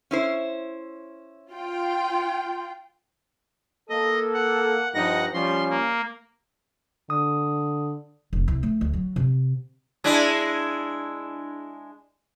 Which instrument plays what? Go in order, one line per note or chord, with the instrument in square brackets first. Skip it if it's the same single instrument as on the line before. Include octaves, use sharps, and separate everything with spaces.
[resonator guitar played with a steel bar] C#4 E4 C5
[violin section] F4 G5
[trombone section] A#3 A4 [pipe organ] D#5
[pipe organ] F#5
[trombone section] G2 F3 D#4 [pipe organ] F#5 A#6
[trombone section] F3 G3 C#4 [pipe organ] C6
[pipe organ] A#3
[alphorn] D3 [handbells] D#6
[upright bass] F1
C2
A3
D2
F#3
C3
[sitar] G#3 D4 E4